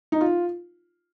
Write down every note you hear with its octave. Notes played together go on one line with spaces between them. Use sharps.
D#4
F4